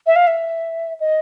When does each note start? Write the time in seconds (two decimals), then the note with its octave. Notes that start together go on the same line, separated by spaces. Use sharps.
0.07 E5
0.16 F5
0.27 E5
1.00 D#5